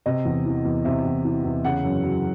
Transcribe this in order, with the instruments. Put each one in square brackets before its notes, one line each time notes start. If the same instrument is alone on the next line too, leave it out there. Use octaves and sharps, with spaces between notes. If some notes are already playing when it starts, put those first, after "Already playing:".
[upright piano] C3 D#5
E2
E3
E2
C3 E5
E2
E3
E2
C#3 F#5
F#2
F#3